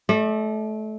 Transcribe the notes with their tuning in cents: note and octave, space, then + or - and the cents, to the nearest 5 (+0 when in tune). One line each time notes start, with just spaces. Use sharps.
A3 -25 D5 +30